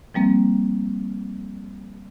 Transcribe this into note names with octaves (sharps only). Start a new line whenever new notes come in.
F3 G3 A#3 C4